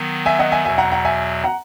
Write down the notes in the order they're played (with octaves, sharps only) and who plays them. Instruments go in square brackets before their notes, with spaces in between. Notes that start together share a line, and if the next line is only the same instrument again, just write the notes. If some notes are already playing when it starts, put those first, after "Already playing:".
Already playing: [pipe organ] D#3 F#3 B3
[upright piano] E5 G#5
D#5 F#5
E5 G#5
[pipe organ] E2 B2 F#3 [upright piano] E5 G#5
[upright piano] F#5 A#5
F#5 A#5
E5 G#5
F#5 A#5